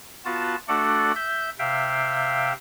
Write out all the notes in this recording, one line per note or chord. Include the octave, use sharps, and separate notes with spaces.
B3 F4 F#4 A5
A3 D4 F#4 A4 D5 F#5
E5 G6
C3 E5 F5 G5